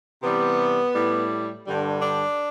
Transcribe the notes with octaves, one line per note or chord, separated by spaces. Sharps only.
C3 E3 G3 B3
A2 G3
G2 D3 G3
D4